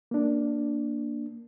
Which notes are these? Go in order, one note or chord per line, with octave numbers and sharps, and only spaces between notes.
A#3 D4